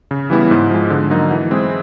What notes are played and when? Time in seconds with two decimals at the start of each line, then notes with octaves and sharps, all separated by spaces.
0.11 C#3
0.30 E3 G3 B3 E4
0.51 G#2
0.70 F3 G#3
0.90 D3
1.10 F#3 A#3 D#4
1.31 E3
1.51 G#3 C4 E4 G#4